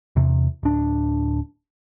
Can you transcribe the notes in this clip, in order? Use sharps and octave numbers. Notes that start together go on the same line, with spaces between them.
E2 C3
D1 D4